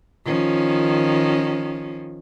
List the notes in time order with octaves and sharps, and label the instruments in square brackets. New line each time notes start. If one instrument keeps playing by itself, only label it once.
[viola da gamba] D#3 F3 C#4